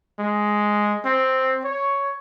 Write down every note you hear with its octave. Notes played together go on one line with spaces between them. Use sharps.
G#3
C4
C#5